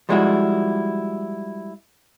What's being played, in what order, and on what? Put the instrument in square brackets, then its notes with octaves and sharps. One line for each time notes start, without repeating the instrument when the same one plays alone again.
[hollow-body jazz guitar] F3 G3 G#3 E4 F#4